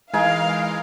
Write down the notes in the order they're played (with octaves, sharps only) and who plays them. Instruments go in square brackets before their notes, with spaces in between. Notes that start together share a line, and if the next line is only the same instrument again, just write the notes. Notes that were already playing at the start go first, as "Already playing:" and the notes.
[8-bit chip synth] E3 G#3 [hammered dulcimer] D#4 A#4 G#5 [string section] F5